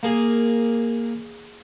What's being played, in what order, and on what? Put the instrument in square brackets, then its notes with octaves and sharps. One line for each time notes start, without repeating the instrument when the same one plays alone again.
[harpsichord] A#3 G#4